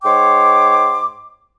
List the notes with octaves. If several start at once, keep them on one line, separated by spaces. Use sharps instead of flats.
G#2 C#5 G5 C6 D6